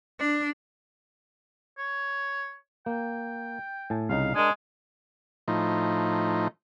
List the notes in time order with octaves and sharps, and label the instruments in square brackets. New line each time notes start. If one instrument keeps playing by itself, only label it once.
[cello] D4
[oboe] C#5
[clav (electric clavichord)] A#3 [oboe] G5
[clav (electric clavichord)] A2 G#5 A5
[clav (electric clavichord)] C2 C#3 D#4 [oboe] F5
[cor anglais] G#3 [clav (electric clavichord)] D4 A#4 [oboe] G#5
[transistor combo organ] A2 F3 D#4